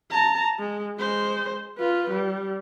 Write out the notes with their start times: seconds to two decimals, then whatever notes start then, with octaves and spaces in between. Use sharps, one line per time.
0.11 A5 A#5
0.59 G#3
0.99 G#3 C5
1.78 F4 B4
2.11 G3